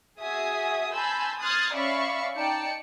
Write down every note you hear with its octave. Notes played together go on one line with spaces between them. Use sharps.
F#4 G#4 E5 G#5 D#6
G#5 A5 B5 C6 E6 G6
C6 D#6 F6 F#6 G#6 A6
C#4 D5 E5 F5 B5 C#6
D#4 D5 G5 A5 C#7